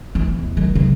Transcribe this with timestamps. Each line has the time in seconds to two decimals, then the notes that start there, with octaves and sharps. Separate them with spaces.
0.15 E3
0.39 E2
0.57 D#3 F#3
0.75 C#3